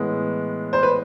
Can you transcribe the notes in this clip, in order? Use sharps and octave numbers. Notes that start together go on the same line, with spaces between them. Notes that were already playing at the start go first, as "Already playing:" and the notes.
Already playing: A2 E3 G#3 B3
C5
B4